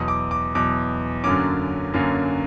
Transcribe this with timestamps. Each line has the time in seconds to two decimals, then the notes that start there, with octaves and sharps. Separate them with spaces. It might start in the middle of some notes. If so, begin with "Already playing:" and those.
Already playing: E2 B2 F#3 D#6
0.08 D6
0.31 D6
0.55 E2 B2 F#3 D6
1.24 F#2 D3 F#3 A#3 C#4 D6
1.94 F#2 D3 F#3 A#3 C#4